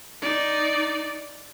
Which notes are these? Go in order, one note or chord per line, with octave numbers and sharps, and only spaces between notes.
D#4 D5